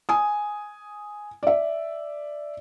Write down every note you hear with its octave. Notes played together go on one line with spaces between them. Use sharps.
G#5 D#6
D5 E5